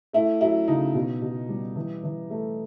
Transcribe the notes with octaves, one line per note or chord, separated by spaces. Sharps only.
A3 E4
F#3 E4
C#3 D#4
B2
B2
G3
E3
E3
A3